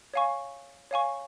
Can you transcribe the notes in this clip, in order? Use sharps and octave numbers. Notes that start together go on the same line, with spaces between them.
C#5 F5 G#5 C#6
C#5 F5 G#5 C#6